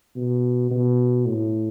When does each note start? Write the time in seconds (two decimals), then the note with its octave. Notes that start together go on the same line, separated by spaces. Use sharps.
0.16 B2
0.71 B2
1.25 A2